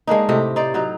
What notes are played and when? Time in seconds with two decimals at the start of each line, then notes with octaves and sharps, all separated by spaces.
0.07 G#3 A#3 D4 D#4
0.29 A2 C3 G4 D#5
0.56 D#4 C5 D5
0.74 F#3 D#4